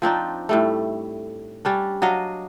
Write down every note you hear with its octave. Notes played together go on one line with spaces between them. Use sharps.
F3 C4 D4 D#4
A2 G3 A3
G3 C#4 D4
F#3 D4 D#5 F5